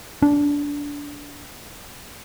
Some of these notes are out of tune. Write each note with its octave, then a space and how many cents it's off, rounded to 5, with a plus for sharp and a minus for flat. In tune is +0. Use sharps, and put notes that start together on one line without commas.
D4 -20